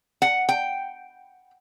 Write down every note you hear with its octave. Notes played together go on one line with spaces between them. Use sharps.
F#5
G5